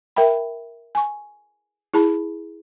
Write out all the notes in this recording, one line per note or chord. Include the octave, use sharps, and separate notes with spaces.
A#4 E5 G5 B5
G#5 C#6
E4 G#4 A5 B5